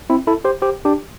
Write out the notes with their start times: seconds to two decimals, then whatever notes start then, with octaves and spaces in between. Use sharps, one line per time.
0.10 C4 E4
0.27 E4 A4
0.45 G4 C5
0.62 G4 C5
0.85 D4 G4